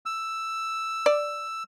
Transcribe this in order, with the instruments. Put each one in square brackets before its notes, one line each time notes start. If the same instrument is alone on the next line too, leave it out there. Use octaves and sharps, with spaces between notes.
[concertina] E6
[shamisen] D5